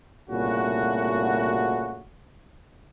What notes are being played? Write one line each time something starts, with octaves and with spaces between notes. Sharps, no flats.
C2 A#2 C#3 A3 F#4